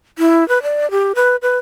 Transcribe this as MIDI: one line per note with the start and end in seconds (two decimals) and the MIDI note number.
0.19 0.47 64
0.49 0.62 71
0.63 0.90 74
0.91 1.13 67
1.15 1.36 71
1.42 1.57 71